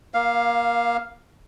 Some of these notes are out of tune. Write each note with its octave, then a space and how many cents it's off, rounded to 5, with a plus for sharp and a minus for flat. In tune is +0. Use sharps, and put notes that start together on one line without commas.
A#3 +20 F5 +0